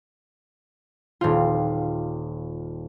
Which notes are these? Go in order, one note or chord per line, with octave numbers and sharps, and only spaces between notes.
D#1 C4 F4